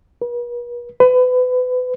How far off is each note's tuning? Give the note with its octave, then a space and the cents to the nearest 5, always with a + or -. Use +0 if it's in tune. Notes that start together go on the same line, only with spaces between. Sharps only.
B4 -45
B4 +30